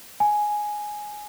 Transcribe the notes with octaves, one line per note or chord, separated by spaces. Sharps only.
G#5